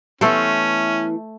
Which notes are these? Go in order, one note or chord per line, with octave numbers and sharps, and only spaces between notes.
E3 A3 B3 C#4 E4 A4 C5